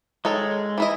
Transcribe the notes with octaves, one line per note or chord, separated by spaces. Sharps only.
D#3 G#3 A4 C#5
E3 E4 D#5